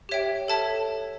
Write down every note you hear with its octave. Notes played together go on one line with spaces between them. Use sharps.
G4 C#5 E5 G5
A4 C#5 E5 A5